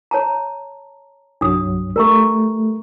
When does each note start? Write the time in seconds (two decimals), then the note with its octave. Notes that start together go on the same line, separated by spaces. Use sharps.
0.11 C#5 A5 A#5
1.41 C2 G2 F#3 D4 D#6
1.96 G3 A3 A#4 A#5 C#6